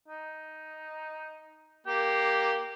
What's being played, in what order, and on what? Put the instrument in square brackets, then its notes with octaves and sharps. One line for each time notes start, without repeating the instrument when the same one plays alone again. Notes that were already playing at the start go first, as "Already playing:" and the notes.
[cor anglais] D#4
[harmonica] A#3 [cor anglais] G4